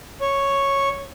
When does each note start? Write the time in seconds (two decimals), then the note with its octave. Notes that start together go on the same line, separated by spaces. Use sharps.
0.21 C#5